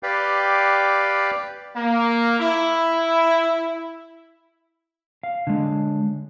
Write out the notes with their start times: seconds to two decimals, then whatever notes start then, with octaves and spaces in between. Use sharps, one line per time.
0.03 G4 B4 D5 F5 G5
1.76 A#3
2.40 E4
5.23 F5
5.47 D3 G#3